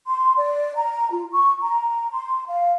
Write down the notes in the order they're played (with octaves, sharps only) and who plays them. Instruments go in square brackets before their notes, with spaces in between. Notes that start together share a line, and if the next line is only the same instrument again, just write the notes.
[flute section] C6
D5
A#5
F4
C#6
A#5
C6
F5